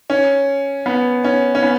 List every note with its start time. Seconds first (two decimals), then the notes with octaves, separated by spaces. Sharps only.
0.10 C#4
0.86 B3
1.25 C#4
1.55 C#4
1.63 B3